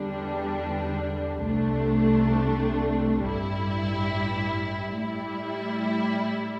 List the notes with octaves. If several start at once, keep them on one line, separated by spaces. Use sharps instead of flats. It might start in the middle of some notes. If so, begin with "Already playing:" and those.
Already playing: E2 D3 G3 D4
C2 C3 A3 D4
A1 G2 G3 E4
A2 G3 E4